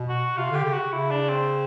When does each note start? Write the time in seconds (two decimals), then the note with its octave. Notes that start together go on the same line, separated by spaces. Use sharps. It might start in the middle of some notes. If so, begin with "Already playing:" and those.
Already playing: B2
0.09 F#4
0.36 C3 F4
0.51 D3 G4
0.65 C#3
0.74 F#4
0.92 C#3 E4
1.11 D4
1.29 C4